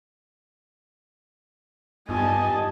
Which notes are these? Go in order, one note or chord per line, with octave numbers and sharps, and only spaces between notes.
G2 B3 D#4 F4 G4 D#5 G#5 A5